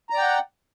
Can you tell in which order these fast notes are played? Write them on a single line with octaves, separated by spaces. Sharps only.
A#5 D5 G5 F#5